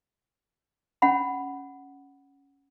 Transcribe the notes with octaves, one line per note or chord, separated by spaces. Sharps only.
C#4 F#5 B5